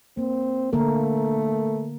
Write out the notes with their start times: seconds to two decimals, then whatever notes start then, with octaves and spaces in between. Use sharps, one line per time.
0.17 A#3 C4
0.73 D3 A3 A#3 A#4